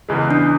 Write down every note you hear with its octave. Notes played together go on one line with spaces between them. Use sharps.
E2 C#3 E3 G#3
D4